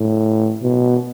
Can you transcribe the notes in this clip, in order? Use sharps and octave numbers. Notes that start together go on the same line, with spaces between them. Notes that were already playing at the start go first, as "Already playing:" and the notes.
Already playing: A2
B2